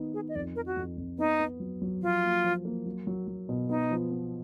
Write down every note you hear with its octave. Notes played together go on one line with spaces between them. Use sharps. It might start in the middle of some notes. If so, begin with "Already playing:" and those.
Already playing: D#3 B3 D#4
D#4 G#4
D#5
F2 D5
F3 A#4
F#4
F2
F2
B3 D#4
B3
F#3
F#3
F3 F4
A#3
F3
A#3
F#3
F#3
F#3
B2
B3 D#4
F3
B3